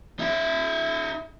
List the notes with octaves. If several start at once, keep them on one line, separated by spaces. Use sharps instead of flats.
D#4 E5